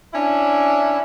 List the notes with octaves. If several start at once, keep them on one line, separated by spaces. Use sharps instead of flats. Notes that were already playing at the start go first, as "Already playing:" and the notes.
C#4 D4 E4